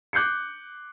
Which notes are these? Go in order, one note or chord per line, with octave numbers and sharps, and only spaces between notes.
D6 F#6 G6 C7 C#7